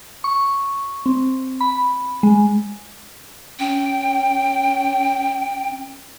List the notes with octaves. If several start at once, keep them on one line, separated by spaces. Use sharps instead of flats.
C#6
C4
B5
G#3
C#4 G5